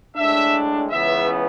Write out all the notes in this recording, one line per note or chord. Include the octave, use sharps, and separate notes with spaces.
A2 G#3 D4 E5
C#2 C#3 E3 B3 E5